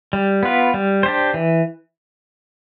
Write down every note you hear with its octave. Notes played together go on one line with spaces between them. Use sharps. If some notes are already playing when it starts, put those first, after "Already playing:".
G3
B3 F4 B4
G3
D4 G4 C5
E3